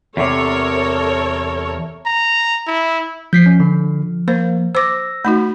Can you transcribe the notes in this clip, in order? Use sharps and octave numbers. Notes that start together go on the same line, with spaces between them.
E2 C3 A4 A#4 C#5
A#5
E4
F3 G6 B6 C7
C#4
D3
A#3 C5
C5 D6 E6 A#6
A3 D#4 F#4 B5